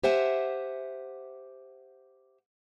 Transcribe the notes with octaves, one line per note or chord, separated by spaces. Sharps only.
G4 C5 E5 F#5 G#5